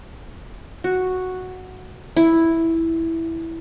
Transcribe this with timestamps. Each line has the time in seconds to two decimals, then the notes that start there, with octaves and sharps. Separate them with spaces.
0.84 F#4
2.16 E4